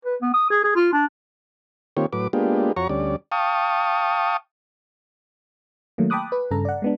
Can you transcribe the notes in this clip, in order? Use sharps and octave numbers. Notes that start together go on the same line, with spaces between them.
B4
B3
D#6
G#4
G#4
F4
D4
D#3 A#3 C4 F4 G4 C#5
A2 F#3 B4 D6
G#3 A#3 B3 D4 F4 G4
F2 F#4 C#5 A#5 C#6
D2 G3 C#4 D5
F5 G5 A5 C#6 D#6
D#3 F#3 A3 A#3
G5 A5 B5 D6 D#6 F#6
B4
G2 C#3 A4 A#5
D5 F#5
G#3 B3 D4